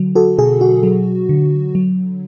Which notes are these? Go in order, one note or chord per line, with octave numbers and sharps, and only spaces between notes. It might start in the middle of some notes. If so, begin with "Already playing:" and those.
Already playing: D3 F#3
F#4 A4
B2 G#4
F#4
F#3
D3
F#3